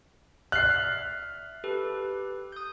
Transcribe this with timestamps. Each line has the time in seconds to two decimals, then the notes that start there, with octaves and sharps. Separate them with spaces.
0.52 D5 E5 F6 F#6 C7
1.64 G4 A4 B4
2.52 D#6 G6